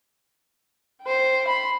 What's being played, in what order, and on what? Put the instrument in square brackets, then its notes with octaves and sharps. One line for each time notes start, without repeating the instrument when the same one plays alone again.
[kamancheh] C5 G5
B5 C6